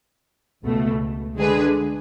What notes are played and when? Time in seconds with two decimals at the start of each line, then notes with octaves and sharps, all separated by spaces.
0.64 C#2 B2 A3
1.37 D3 G#3 D4 G#4 B4